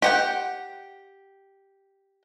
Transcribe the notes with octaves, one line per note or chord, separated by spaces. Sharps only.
G4 F#5 G5